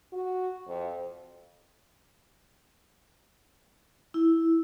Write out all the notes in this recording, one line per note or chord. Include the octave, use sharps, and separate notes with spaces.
F#4
F2
E4